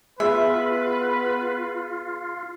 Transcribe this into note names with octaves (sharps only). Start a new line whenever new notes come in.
B3 F4 G#4 B4 E5